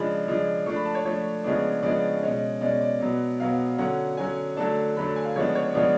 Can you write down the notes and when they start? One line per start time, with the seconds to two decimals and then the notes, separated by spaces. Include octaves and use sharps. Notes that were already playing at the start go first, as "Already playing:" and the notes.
Already playing: C#3 F3 G#3 D4 B5
0.26 C#3 F3 G#3 D4
0.66 F3 A3 D4 C#6
0.76 B5
0.85 A5
0.95 C#5
1.05 F3 A3 D4 C#5
1.44 C#3 F3 G#3 B3 D4
1.83 C#3 F3 G#3 B3 D4 D5
2.23 B2 G#3 C#4
2.61 B2 G#3 C#4 D5
2.81 D5
3.00 B2 F#3 B3
3.40 B2 F#3 B3 F5
3.78 D3 F#3 C#4 F#5
4.17 D3 F#3 C#4 G#5
4.57 D3 F#3 A3 D4 A5
4.96 D3 F#3 A3 D4 B5
5.16 G#5
5.25 F5
5.36 C#3 F3 G#3 B3 D4 C#5
5.55 C#5
5.74 C#3 F3 G#3 B3 D4 D5